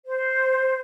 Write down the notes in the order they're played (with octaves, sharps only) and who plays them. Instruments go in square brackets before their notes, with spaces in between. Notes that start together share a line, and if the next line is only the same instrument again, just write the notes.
[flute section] C5